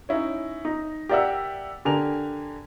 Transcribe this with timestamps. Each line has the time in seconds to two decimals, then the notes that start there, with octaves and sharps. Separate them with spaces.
0.09 C#4 D#4 E4 C#5
0.65 D#4
1.09 G4 A#4 D5 E5 F#5 E6
1.85 D3 G4 A#4 G#5 F7